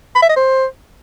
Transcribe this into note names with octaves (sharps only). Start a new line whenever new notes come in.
B5
E5
D#5
C5